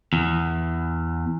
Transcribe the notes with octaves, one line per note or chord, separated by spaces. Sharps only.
E2